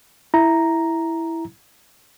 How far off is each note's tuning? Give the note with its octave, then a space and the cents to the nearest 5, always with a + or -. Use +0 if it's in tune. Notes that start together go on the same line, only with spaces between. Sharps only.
E4 +0 A#5 +0